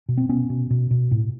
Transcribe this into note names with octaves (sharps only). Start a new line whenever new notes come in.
B2
C4
B2 B3 C#4
B2
B2
B2
A2